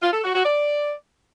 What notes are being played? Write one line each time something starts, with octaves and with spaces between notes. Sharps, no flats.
F4
A4
F#4
F#4
D5